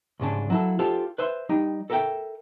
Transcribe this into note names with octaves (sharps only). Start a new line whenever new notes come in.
C2 G#2 C#3 D4
F#3 E4 A4
F4 G4 A4 C5
B4 C5 E5 C6
G3 D#4 G5
A4 A#4 E5 F5 G5